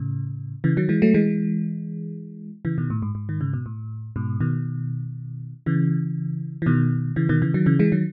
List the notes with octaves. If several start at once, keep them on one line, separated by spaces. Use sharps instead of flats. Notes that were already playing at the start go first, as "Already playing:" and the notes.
Already playing: A2 C#3
C#3 E3
D#3 F#3
E3 G#3
F#3 A3
E3 G#3
C#3 E3
B2 D#3
A2
G#2
G#2
D#3
C#3
B2
A2
G#2 B2
B2 D#3
C#3 E3
E3
B2 D#3
C#3 E3
B2 D#3
C#3 E3
D#3 F#3
C#3 E3
E3 G#3
D#3 F#3